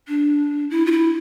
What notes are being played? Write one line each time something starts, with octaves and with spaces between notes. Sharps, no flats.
D4
E4
F4
E4